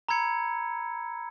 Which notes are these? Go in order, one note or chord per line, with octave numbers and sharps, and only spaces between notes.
A#5 B5 E6 G#6 C#7